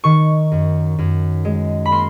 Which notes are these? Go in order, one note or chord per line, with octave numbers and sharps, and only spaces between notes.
D#3 C#6
F#2
F#2
G#3
B5
A#3 C6